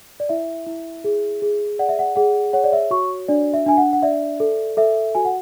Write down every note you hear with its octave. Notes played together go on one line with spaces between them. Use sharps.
D5
E4 E5
E4
G#4
G#4
D5 F#5
E5
F#5
G#4 F#5
C#5 F#5
D5
E5
F#4 C#6
D4 D5
E5
D4 G#5
F#5
F#5
D5 E5
A4
A4 E5
F#4 G#5
F#5